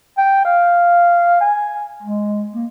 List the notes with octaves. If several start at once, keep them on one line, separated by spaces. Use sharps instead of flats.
G5
F5
G#5
G#3
A#3